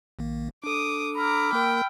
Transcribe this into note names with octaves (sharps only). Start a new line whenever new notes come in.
A#1 D#3 A#3
D4 A4 D6 D#6
A#5 B5 D6 E6 F6
A#3 A#4 G5